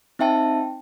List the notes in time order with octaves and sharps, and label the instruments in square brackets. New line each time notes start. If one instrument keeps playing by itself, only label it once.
[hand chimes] C4 D#4 E5 G5 A5